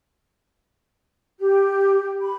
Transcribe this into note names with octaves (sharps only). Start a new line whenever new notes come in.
G4
B5